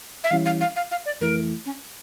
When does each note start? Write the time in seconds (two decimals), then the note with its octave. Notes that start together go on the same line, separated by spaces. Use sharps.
0.24 E5
0.31 E3 G3 C#4 E4 F5
0.45 F5
0.61 F5
0.76 F5
0.91 F5
1.06 D5
1.21 F2 E3 A3 E4 A#4
1.66 C#4